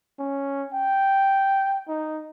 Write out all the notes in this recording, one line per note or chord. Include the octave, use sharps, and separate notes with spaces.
C#4
G5
D#4